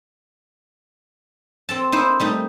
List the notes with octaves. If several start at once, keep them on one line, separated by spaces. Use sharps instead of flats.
C4 A4 A5
D#4 E4 C5
G3 A3 D#4